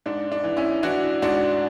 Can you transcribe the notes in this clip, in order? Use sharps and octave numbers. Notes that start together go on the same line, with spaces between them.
G#2 D4
D4
E3
C#4 E4
E3 D4 F#4
G#2 D4 F#4